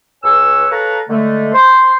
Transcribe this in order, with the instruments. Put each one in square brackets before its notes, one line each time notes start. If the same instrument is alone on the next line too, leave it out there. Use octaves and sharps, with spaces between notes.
[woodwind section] C#2 B4 C#5 G#5 E6
A4 B4 C#5 F5 A5 A#5
D3 G#3 A3
C5 C6